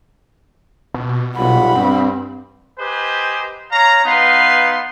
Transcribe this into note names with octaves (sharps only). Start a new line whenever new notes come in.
B2
B1 G3 F4 F#5 B5
G2 C4
G4 B4 C5 D#5 G#5
C#5 F5 A#5
B3 D#4 B4 F5 C6